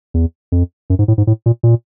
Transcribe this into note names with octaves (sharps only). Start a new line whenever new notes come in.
E2
F2
F#2
G#2
A2
G#2
A2
A#2
A#2